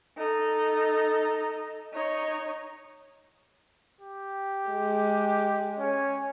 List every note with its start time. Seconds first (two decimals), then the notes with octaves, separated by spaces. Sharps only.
0.17 D#4 A4
1.93 D#4 C#5
4.01 G4
4.70 G#3
5.79 C#4